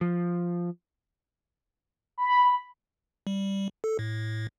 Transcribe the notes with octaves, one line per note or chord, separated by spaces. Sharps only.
F3
B5
G3
A4
A2